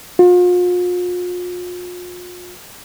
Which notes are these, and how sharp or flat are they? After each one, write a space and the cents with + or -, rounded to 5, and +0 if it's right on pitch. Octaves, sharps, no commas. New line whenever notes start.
F4 +40